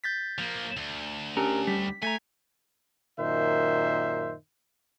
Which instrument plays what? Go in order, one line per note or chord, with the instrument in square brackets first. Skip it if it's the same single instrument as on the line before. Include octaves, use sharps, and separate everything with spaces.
[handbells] G6 A6 B6
[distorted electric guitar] F3 A#3
D2
[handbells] C#4 D4 G4 [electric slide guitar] A#4
[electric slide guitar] G3 [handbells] B6
[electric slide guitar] A3 [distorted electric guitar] G#5 [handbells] A#5 G#6 B6
[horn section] F#2 A#2 D#3 C5 E5